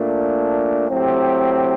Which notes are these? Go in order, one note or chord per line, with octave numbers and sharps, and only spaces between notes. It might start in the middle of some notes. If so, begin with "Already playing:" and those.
Already playing: A#2 A3 D4
A2 F#3 C4 G4